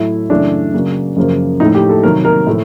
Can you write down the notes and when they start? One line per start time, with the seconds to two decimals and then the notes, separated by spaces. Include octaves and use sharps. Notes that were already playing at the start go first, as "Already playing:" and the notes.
Already playing: A2 F#3 A3 E4
0.30 F#2 C#3 E3 A3 D4
0.74 C#3 F#3 A#3
1.16 F#2 C#3 F3 A#3
1.60 A2 F3 A3 D#4
1.75 G4
1.89 A4
2.03 C3 D#3 F#3 A#3 A#4
2.25 A#4
2.46 A2 F3 A3